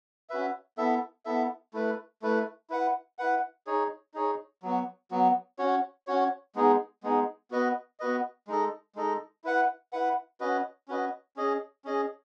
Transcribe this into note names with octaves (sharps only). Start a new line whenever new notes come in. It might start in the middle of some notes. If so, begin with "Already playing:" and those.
C#4 F#4 B4 E5
B3 E4 A4 E5
B3 E4 A4 E5
A3 E4 B4
A3 E4 B4
E4 B4 F#5
E4 B4 F#5
D#4 G#4 C#5
D#4 G#4 C#5
F#3 B3 F#4
F#3 B3 F#4
C#4 F#4 C#5
C#4 F#4 C#5
G#3 B3 D#4 G#4
G#3 B3 D#4 G#4
B3 F#4 B4 D#5
B3 F#4 B4 D#5
G#3 D#4 A4 D#5
G#3 D#4 A4 D#5
E4 B4 F#5
E4 B4 F#5
C#4 F#4 B4 D#5
C#4 F#4 B4 D#5
C#4 G#4 D#5
C#4 G#4 D#5